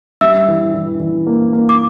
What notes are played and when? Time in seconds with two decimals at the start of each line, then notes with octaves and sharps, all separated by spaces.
0.21 G3 E5 E6
0.48 E3
0.74 E3
1.00 E3
1.27 A#3
1.53 A#3
1.69 D6